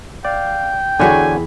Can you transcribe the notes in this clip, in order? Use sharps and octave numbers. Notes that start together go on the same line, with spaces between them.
D5 F5 G5
E2 D3 E4 F#4 G#4 C#5 G#5